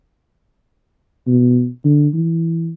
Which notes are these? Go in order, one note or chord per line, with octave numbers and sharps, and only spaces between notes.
B2
D3
E3